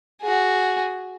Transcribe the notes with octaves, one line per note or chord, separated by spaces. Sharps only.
F#4 G#4